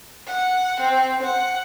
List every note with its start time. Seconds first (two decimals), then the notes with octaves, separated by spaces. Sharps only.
0.26 F#5
0.80 C4
1.22 F#5